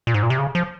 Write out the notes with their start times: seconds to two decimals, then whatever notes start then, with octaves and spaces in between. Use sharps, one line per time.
0.07 A#2
0.14 G#2
0.23 A#2
0.30 C3
0.38 C#3
0.55 F3